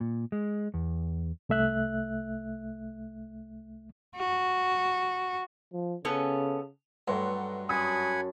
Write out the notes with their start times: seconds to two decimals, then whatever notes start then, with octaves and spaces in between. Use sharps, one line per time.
0.01 A#2
0.32 G#3
0.74 E2
1.49 C2 A3 E5 F#6
4.16 F#4
5.73 F3
6.05 C#3 B3 C#4 A4
7.08 G2 F#3 A3 B4 F#5 C6
7.69 F#2 F#5 G#5 A5 B5 D#6